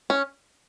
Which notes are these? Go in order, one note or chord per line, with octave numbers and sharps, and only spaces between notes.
C#4